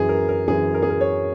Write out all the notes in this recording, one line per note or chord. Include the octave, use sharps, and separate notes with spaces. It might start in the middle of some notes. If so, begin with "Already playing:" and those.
Already playing: F#2 E3 G#4
A#4
A#4
F#2 E3 G#4
A#4
G#4
A#4
C#5